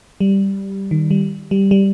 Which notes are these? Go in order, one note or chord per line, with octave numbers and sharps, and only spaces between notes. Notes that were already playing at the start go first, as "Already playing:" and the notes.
G3
D#3
G3
G3
G3